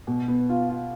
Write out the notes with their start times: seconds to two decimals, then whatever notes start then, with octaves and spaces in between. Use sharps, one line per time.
0.07 B2
0.28 B3
0.49 F4
0.69 F4